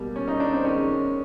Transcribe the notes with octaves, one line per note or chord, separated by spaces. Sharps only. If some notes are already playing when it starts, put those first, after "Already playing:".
Already playing: B2 G3 A#3
C#4
D#4
D4
C4
D#3 G#3 C#4